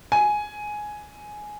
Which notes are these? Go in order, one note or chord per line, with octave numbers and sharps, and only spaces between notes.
G#5